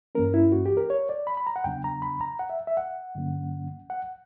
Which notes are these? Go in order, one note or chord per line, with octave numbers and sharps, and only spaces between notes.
G2 E3 A#3 C#4 A#4
E4
F#4
G4
A#4
C#5
D5
B5
B5
A#5
F#5
E2 C#3 F#3 B3 D4 G5
A#5
B5
A#5
F#5
E5
E5
F#5
G2 D3 F#3 A#3 C#4
F#5